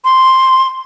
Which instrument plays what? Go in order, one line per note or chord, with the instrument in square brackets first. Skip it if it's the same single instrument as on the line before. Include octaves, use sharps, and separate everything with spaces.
[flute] C6